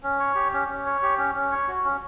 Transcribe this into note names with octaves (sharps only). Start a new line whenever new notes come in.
C#4
C#5
G4
C#4
C#4
C#5
G4
C#4
C#4
C#5
F#4
C#4